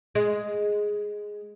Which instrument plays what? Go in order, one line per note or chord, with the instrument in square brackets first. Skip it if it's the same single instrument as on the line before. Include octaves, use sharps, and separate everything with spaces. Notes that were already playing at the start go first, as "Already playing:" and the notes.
[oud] G#3